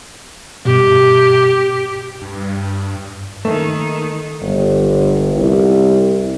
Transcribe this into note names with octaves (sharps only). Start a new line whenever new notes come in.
G2 B2 G4
G2
D#3 A3 A#3
G1
C2